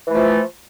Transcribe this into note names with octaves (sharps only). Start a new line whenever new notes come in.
E3 F3 A3